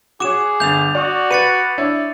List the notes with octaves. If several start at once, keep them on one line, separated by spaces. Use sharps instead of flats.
F#4 G#4 C#5 D6 E7
G1 G6 A6 F7
F#4 D5 C#6 D#6
B4 A6 C#7 D#7
D4 E4 C#5